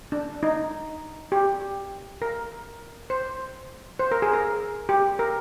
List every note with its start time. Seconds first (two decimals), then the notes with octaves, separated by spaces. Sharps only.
0.12 D4
0.43 D#4
1.32 G4
2.22 A#4
3.10 C5
3.99 C5
4.12 A#4
4.22 G#4
4.33 A#4
4.89 G4
5.19 A#4